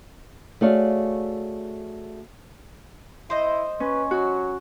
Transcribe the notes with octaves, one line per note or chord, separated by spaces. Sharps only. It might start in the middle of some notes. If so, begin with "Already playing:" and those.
A3 F#4 G#4 C#5 D5 F5
E4 C5 D#5
C#4 B4
F#3 F#4